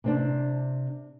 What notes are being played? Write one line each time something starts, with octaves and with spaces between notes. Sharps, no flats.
C3 C4 D4